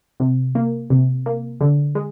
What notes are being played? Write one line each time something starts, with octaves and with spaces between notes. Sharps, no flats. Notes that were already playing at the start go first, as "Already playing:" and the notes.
C3
A#3
C3
A#3
D3
G#3